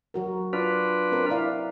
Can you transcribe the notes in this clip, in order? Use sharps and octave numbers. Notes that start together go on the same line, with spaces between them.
F#3 F#4 A#4
D4 F4 B4
C4 A#4 C5
E4 D5 F5